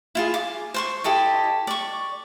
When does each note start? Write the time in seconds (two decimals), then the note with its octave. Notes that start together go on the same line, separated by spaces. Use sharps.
0.15 E4 F4 G#4
0.34 D6
0.74 C5 C6 C#6
1.04 E4 G4 A4 D#5
1.67 D5 C#6